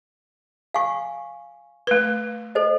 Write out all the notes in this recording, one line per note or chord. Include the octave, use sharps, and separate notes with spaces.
F5 G#5 C#6
A3 B4
A4 C5 D#5